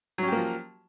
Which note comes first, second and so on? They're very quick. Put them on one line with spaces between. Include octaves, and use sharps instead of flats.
F#3 C#4 G4 A#3 F3